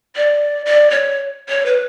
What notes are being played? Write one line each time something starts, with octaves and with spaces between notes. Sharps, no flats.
D5
D5
C#5
C#5
B4